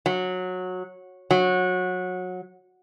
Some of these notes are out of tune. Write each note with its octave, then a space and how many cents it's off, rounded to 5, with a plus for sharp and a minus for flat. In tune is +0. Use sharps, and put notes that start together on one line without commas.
F#3 -15
F#3 -20